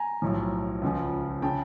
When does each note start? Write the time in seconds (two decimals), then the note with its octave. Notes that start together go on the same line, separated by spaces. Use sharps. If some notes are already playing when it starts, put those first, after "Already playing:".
Already playing: G#5 A#5
0.22 B1 A2 F3
0.82 C#2 C#3 F3
1.42 C#3 G5 A5